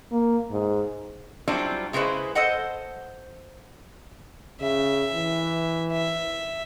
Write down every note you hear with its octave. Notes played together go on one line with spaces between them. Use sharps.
A#3
G#2
F#3 G3 C4 D4 E4 F4
C#3 G#3 E4 F4 B4 C5
A4 C5 D#5 F#5
C#3 E5
E3
E5